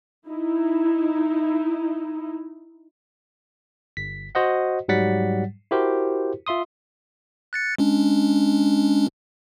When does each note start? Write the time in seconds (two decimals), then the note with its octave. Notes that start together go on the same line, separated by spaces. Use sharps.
0.27 D#4 E4
3.97 G1 B6
4.35 F#4 C5 D#5 F#5
4.88 G#2 F#3 G3 F#5 A6 B6
5.71 E4 F#4 G4 A#4 C5
6.46 F4 E5 C6 D#6
7.53 F#6 A6 C#7
7.78 G#3 C#4 D4